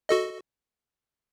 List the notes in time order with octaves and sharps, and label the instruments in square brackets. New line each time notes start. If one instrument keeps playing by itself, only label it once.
[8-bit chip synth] F#4 A4 D#5